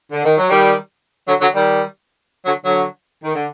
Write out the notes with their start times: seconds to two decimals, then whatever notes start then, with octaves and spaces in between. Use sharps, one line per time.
0.12 D3
0.25 D#3
0.38 F#3
0.50 D#3 G3
1.28 D3 F#3
1.41 D3 F#3
1.54 D#3 G3
2.45 D3 F#3
2.65 D3 F#3
3.24 D#3
3.35 D3